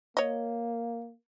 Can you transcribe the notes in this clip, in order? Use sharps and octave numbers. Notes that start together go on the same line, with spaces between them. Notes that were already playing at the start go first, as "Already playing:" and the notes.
A#3 C#5 D#5